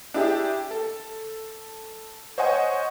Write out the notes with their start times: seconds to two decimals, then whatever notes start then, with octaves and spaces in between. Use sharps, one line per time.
0.14 D4 E4 G4 G#4
0.71 A4
2.38 C5 C#5 D#5 F#5 G#5